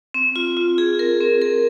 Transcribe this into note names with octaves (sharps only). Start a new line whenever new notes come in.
C4
F4
F4
G#4
A#4
C4
A#4